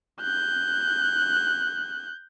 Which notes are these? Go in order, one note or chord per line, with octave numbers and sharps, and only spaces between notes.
F#6 G6